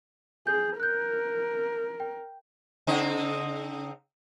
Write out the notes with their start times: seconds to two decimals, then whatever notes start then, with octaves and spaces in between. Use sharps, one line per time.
0.47 G#4 G6
0.80 A#4 F#6 G6
2.00 G5
2.87 C#3 C4 D#4